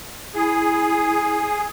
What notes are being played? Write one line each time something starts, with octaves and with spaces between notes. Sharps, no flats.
E4 G#4